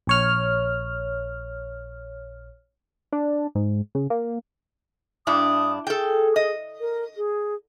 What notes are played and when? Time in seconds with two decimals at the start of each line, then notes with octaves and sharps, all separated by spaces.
0.07 A#1 C#5 F6
3.13 D4
3.55 G#2
3.95 C#3
4.10 A#3
5.27 G2 D4 E4 D#6
5.87 G#4 A4 G5
6.36 D#5
6.80 A#4
7.17 G#4